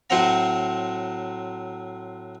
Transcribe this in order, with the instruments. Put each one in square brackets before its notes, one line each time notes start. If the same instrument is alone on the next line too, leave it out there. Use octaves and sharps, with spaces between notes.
[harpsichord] A2 F#3 C4 C5 F#5 A#5